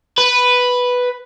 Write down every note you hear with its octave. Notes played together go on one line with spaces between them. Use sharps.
B4